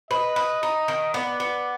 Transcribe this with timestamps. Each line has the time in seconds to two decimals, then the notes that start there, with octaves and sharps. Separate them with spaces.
0.11 B4 D#5
0.36 B4
0.63 D#4
0.88 D#3
1.14 B3 D5
1.40 B3